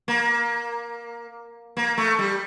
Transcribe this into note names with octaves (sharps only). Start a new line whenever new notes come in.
A#3
A#3
A3
G3